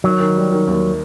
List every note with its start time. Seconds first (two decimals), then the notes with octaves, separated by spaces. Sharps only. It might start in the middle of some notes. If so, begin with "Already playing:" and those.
0.04 D#3 F#3
0.20 D#3
0.36 G3
0.52 D#3
0.67 D#2